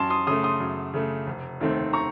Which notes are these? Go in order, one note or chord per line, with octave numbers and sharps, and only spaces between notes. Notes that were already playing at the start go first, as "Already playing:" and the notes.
Already playing: F#2 A5 C6
C6 D#6
C#3 A3 C6 D#6
C6 D#6
F#2
C#3 A3
F1
D#2 D#3 A3 C4
A#5 C#6